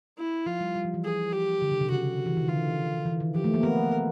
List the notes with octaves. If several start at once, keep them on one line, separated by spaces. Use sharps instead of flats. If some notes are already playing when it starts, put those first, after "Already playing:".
E4
F3 F4
G3
G3
F3
E3
G#4
G4
D3
C#3
C3
C#3 F#4
E3
D#3
D3 F4
E3
D#3
F3 G4
A3
A#3
B3 A#4